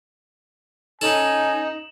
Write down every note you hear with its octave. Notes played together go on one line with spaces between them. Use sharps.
C#4 D#4 A4 G#5 E7 F#7